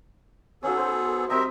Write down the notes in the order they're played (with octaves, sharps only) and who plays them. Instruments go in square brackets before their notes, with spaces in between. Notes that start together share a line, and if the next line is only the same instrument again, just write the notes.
[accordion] B3 G#4 A4 [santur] C#4 D#4 F#4
[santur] C5
[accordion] G3 A#4 E5 [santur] C4 D#5 G5